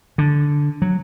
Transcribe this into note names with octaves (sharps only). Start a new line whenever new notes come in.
D3
F#3